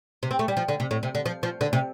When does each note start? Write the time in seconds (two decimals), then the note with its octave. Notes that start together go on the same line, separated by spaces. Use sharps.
0.23 C3
0.31 C4
0.39 A3
0.48 G3
0.57 F3
0.68 D3
0.80 C3
0.91 A2
1.03 C3
1.15 D3
1.26 F3
1.43 F3
1.61 D3
1.73 C3